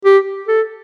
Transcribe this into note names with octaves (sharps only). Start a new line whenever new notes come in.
G4
A4